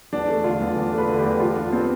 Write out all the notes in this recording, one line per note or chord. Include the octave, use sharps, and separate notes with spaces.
E2 D4
A3
D3 F4
E2
E2
A3
B4
D3
G4
E2
F3 F4
D4
B3 C4